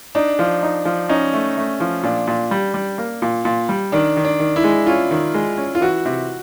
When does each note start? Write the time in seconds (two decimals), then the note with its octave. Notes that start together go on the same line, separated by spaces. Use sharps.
0.15 D4 D#4
0.39 F3
0.63 D#4
0.85 F3
1.09 C#4 D#4
1.34 A3
1.57 A3
1.80 F3
2.03 A#2 D4
2.27 A#2
2.51 G3
2.74 G3
2.98 A#3
3.22 A#2
3.45 A#2
3.69 G3
3.92 D#3 D4
4.17 D#3
4.25 D4
4.40 D#3
4.56 E4
4.64 G#3
4.87 C#4 F4
5.11 D#3
5.34 G#3
5.58 C#4
5.75 F4
5.81 E3 F#4
6.05 C3